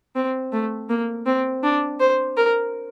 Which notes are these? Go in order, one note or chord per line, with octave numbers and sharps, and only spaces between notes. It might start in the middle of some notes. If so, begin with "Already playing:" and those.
C4
A3
A#3
C4
D4
C5
A#4